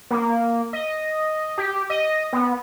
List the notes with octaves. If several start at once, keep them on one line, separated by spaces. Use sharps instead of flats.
A#3
D#5
G4
D#5
B3